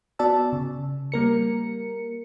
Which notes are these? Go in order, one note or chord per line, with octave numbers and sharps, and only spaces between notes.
B3 F#4 D5 A5 E6
C#3
G3 A#3 A#4 C#7